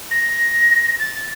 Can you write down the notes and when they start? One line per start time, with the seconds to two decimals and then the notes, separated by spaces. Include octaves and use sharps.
0.11 A#6
1.00 A6